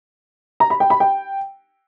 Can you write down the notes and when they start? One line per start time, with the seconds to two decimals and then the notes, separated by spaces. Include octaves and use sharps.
0.60 A#5
0.70 B5
0.80 G5
0.90 B5
1.00 G5